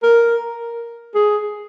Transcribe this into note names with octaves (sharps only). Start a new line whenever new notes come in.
A#4
G#4